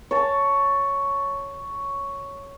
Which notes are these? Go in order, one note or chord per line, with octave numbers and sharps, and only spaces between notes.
C#5 A5